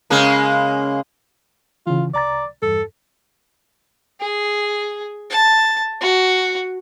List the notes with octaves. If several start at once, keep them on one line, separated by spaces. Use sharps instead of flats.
C#3 G#3 A#3
C#3 E3 F4
C2 D5 A#5 A6
E2 G2 A4
G#4
A5
F#4